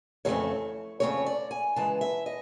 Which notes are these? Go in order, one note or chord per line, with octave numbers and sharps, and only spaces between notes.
F2 C#3 E3 A3 C4 C#5
F2 C#3 E3 A3 C4 C#5
D5
G#5
C#3 E3 G#3 A5
E5
D#5